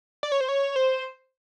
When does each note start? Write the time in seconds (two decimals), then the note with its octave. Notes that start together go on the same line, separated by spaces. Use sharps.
0.23 D5
0.32 C#5
0.41 C5
0.49 C#5
0.76 C5